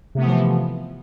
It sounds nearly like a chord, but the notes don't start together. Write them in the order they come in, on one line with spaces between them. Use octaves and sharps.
C3 A3 B3 E3 F3